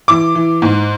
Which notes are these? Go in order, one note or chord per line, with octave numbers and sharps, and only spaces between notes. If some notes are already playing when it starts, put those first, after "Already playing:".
E3 D6
E3
G#2